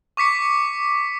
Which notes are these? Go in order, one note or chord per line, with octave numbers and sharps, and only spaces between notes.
C#6 D6 B6 C#7